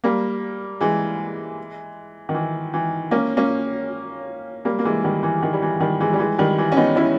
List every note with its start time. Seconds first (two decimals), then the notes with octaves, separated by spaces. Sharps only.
0.04 G3 A#3
0.81 E3 G#3
2.29 D#3
2.34 E3
2.74 E3
3.11 A#3 C#4
3.37 A#3 C#4
4.65 G3 A#3
4.79 A#3
4.85 E3 G#3
5.04 D#3 G3
5.23 E3
5.43 D#3
5.53 G3
5.62 E3
5.80 D#3 G3
6.01 E3 G#3
6.13 G3
6.19 E3 G#3
6.39 D#3 G3
6.58 E3
6.72 C#4
6.77 B3 D#4
6.96 C#4 E4